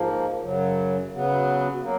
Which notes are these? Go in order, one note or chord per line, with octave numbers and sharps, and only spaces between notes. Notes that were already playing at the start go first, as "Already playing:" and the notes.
Already playing: G#2 F3 A#3
F#2 C#3 F#3
C#3 F#3 B3
F#3 A#3